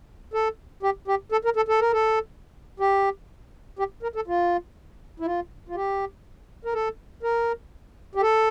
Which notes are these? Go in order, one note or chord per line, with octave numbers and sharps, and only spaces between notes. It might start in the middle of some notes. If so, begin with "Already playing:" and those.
A4
G4
G4
A4
A#4
A4
A4
A#4
A4
G4
G4
A#4
A4
F4
E4
F4
F4
G4
A#4
A4
A#4
G4
A4